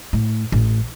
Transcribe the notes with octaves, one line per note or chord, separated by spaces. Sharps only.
A2
A1